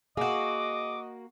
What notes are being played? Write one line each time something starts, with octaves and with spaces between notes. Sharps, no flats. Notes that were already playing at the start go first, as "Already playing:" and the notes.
A#3 F#4 G#4 D#5 D6